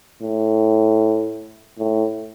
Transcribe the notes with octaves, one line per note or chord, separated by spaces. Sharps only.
A2
A2